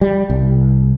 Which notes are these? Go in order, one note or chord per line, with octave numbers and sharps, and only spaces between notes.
G3
C2